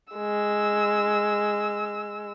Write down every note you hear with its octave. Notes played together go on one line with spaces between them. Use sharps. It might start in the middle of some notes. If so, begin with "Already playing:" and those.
G#3 E6